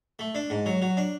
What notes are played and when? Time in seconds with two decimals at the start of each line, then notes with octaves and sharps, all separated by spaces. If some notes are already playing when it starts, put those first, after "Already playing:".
0.19 A3
0.35 D4
0.50 G#2
0.66 F#3
0.82 F#3
0.97 D4